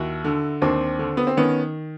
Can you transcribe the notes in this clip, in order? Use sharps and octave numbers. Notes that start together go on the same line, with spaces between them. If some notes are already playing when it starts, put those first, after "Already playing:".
Already playing: D#2 E4 F#4
D3
D#2 C4 D4
D3
B3
C4
D#3 B3 C#4